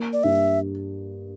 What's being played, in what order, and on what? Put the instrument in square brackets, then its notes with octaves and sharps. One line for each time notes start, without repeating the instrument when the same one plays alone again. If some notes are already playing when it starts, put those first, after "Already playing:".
Already playing: [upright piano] A#3
[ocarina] D5
[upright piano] G2 [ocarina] E5